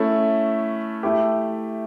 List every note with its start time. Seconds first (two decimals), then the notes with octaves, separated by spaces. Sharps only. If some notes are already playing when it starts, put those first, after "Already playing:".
Already playing: A3 C#4 E4 A4
1.03 A3 E4 G4